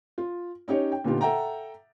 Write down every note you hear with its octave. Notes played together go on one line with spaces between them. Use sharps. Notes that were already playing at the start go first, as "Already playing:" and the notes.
F4
C#4 D#4 G4 C#5
G5
A#2 D3 B3 D#4 F4 G4
A4 E5 F#5 G5 A#5